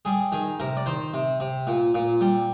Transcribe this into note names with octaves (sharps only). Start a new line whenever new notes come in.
G3 G#4
D#3 G#4
C3 A#4
D5
D#3 C5
C3
C3
A#2
A#2
G3